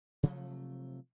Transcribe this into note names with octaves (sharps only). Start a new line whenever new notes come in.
C3 F3 F#3 A3